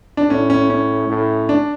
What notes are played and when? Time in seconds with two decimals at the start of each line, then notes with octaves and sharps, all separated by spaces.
0.17 D4
0.29 A2 C#4
0.50 C#4
0.70 C#4
1.09 A2
1.49 D4